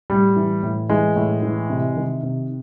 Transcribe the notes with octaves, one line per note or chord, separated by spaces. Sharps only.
A2 G3
E3
A2
E3 G#3
A2
E3
C3
D#3
C3